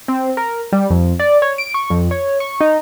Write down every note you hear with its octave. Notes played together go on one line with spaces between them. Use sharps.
C4
A#4
G3
F2
D5
C#5
D7
C#6
F2
C#5
C#6
D#4